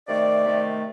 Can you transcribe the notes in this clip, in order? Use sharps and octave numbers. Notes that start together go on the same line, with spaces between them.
C3 D#3 A3 D5
C3 D#3 A3